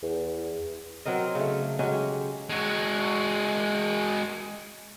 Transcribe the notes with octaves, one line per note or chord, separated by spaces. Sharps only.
E2
F#3 C4 A#4 D#5
C#3 A3
F#3 G#3 C#4 G4
G#3 F#4